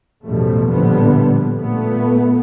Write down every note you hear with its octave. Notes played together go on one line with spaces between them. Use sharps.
A1 E2 B2 F3 G3 A3
A#1 A2 D3 F3 G3 B3
A#2 A3 B3